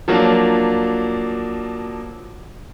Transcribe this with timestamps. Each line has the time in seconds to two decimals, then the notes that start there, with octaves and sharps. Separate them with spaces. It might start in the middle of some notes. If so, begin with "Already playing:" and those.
0.08 F3 F#3 A#3 D4